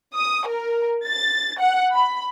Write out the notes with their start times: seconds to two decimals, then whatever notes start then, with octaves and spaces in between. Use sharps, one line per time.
0.16 D#6
0.47 A#4
1.07 A6
1.60 F#5
1.94 B5